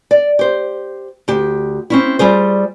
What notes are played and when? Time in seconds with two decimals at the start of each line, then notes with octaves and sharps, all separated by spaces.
0.11 D5
0.39 G4 C5
1.28 D2 G4
1.90 C4 C#4 E4
2.19 G3 F4 G#4 C5